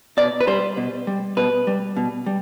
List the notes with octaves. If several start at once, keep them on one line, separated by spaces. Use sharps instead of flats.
B2 D5
B4
G3 C5
B2
G3
B2 B4
G3
B2
G3